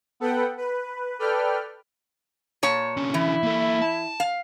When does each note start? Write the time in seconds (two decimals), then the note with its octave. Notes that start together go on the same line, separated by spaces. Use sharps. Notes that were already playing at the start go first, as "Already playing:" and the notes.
0.20 B3 A4 B4 F#5 G5
0.57 B4
1.19 A4 B4 D5 G5 F6
2.63 A#2 C#5 A5
2.97 D3 C#4
3.14 E3 E4
3.43 A#3 A4
3.82 A5
4.20 F5